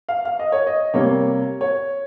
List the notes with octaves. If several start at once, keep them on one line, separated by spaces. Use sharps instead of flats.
F5
F5
D#5
C#5
D#5
C3 G3 A#3 C#5
C#5